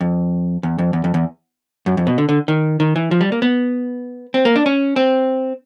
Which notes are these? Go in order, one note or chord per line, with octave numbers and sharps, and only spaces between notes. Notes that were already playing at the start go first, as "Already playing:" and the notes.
F2
E2
F2
E2
F2
E2
F#2
F2
B2
D3
D3
D#3
D#3
E3
F3
G3
A#3
B3
C4
A#3
D4
C#4
C4